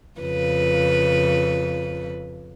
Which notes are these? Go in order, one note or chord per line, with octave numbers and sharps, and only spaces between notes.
F2 C#3 B4